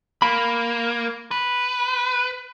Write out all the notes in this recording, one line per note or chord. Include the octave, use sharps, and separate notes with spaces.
A#3 B5
B4